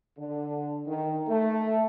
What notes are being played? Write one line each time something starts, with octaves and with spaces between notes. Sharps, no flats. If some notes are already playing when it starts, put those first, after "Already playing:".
D3
D#3
A3